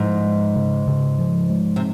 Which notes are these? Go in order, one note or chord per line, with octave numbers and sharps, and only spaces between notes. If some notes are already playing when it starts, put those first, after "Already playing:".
Already playing: G#2 F3
G#3
C#3
C#3
F3
G#3
C3